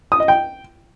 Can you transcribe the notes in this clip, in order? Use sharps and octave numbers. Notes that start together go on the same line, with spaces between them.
D#6
D#5
G5